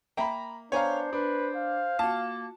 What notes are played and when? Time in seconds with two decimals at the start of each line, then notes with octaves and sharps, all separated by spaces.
0.17 A#3 E5 G5 A#5 B5
0.72 B3 D4 C5 C#5 F5 G#5 A#5
1.13 D4 B4
1.56 F5
1.99 A#3 F4 F#4 A5